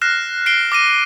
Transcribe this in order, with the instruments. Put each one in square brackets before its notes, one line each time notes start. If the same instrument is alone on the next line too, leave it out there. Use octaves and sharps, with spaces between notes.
[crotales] F6 F#6 A#6 C7 E7
C7 D7 G7
D6 A#6 D#7